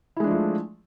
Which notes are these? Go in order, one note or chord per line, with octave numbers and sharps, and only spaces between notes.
F3 G#3 A3 D4 E4